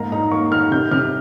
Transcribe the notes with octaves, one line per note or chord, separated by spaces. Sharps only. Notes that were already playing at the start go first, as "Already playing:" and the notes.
Already playing: G#2 A#3 A#5
D#4 A#5
A#3 C#6
D#3 F6
C3 G6
C3 F6